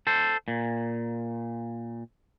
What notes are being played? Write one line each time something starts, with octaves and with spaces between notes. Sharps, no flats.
A4 C5
A#2